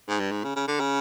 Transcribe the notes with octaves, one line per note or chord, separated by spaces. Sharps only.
G#2
G2
G#2
C#3
C#3
D3
C#3